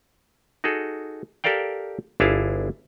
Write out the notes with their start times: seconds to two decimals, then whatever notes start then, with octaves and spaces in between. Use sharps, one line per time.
0.64 D#4 F#4 G#4 A4
1.44 G4 A4 A#4 D5 F5 G5
2.20 G1 D4 E4 G#4 F5 A5